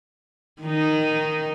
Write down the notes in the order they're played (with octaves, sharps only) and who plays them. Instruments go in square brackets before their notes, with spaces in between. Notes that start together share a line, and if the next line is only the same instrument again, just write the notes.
[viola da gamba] D#3 D#4